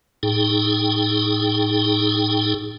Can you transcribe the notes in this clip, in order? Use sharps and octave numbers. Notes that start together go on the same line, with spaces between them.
A2 D#4 G#4 G5